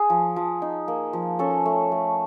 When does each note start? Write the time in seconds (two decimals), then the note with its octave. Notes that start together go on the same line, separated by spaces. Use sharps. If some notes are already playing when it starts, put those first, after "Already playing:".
Already playing: G#4
0.10 F3
0.36 F3
0.62 D#4
0.88 A#3
1.13 F3
1.39 C#4 A4
1.65 A3
1.92 A3